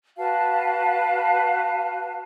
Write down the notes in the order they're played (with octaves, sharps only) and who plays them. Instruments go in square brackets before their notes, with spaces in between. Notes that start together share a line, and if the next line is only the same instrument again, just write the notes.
[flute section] F#4 B4 F5 A5